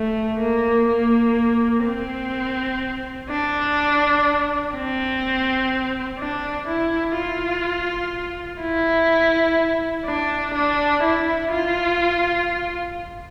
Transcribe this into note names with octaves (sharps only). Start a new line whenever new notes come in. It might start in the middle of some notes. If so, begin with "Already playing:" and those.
Already playing: A3
A#3
A#3
C4
D4
C4
D4
E4
F4
E4
D4
D4
E4
F4